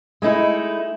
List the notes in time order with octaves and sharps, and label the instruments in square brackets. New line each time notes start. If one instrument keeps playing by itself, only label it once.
[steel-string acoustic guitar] G#3 A3 D#4 E4